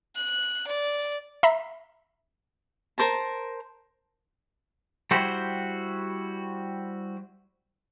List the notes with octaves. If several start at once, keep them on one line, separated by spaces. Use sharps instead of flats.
F#6
D5
E5 A#5 B5 B6 C7
A#4 C5 A5 A#5
G3 E4 F#4 G4 C5